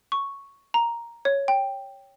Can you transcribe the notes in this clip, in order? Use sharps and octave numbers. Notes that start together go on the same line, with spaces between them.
C#6
A#5
C#5
G5